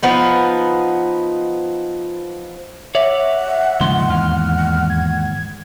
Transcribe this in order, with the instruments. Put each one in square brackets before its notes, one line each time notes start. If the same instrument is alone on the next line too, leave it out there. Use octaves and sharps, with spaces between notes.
[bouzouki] F3 B3 D#4
[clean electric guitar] C#5 D5 [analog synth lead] E5 [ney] F#5
[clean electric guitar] D#2 G#2 C6 [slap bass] C#3 F3
[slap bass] E2 [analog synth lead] F6
[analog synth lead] G#6